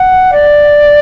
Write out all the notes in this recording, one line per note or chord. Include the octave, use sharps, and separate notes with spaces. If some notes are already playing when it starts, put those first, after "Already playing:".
Already playing: F#5
D5